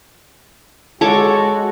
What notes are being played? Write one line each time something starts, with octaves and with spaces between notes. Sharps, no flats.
G#3 F#4 A4 C#5 D6